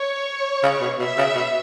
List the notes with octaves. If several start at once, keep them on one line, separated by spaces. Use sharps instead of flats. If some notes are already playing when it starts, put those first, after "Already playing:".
Already playing: C#5
C#3
B2
B2 E5
C#3
B2